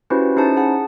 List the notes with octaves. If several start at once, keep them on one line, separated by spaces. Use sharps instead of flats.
C#4 E4 F#4 G4 B4 C5
C#4 D#4 E4 G#4 C5 A5
G#4 F#5 A5